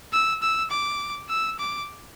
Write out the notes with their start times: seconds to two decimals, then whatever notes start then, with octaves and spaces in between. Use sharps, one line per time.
0.13 E6
0.42 E6
0.70 D6
1.29 E6
1.59 D6